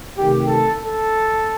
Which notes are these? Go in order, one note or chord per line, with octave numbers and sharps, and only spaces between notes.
C3 D#3 A3 G4
A4
A4